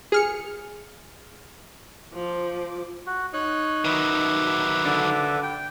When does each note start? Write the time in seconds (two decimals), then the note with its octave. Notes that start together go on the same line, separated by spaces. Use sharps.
0.12 G#4 F6 C#7
2.13 F3 D6
3.07 F#4
3.34 D#4 C#5 F#6
3.85 D#3 F#3 B4 E5 D6
4.85 D3
5.44 G5